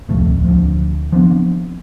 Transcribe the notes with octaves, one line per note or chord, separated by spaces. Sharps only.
D1 C2 F2 A3
D2 F3
F3 B3 C4 D4